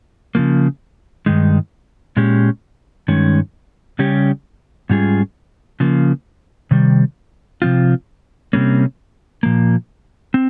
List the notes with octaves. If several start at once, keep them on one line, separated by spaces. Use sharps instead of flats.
C#3 F3 A#3
G2 D#3 G#3 D#4
A#2 G#3 C#4 G4
G2 D#3 G#3 C#4
C#3 G3 C#4 G4
G#2 G3 C#4 F4 G#4
C#3 F3 A#3
C3 D#3 G3
C3 F3 C4 F4
C3 G3 A#3 C#4
A#2 F3 A#3
C4